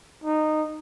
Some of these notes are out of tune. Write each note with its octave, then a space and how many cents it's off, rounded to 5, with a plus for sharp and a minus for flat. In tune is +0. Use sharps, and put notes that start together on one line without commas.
D#4 -15